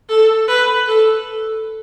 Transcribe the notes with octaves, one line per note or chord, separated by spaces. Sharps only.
A4
B4
A4